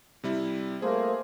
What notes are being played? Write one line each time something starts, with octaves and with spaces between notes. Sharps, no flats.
C3 G3 E4
G3 A3 A#3 G#4 C5